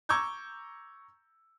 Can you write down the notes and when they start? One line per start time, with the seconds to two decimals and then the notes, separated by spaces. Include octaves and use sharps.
0.09 A#5 C#6 D6 E6 G6 G#6